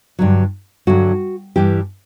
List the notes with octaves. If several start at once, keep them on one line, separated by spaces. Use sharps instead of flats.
G2 D3 F#3
G2 D3 F#3 F#4
G2 E3 G3 G4